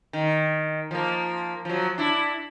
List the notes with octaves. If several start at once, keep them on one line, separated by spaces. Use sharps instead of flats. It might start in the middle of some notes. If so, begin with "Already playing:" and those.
D#3
F3 A#3
F3 F#3
D4 E4